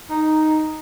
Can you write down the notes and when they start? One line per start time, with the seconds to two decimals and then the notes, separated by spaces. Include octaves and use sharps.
0.10 D#4